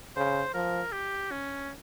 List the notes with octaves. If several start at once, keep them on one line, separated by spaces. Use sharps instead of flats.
C#3 C5
F3 A#4
G4
C#4